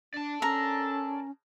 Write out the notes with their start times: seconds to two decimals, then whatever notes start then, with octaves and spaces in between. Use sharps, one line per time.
0.14 D4 D5 A5
0.42 C#4 A4 A#4 A#5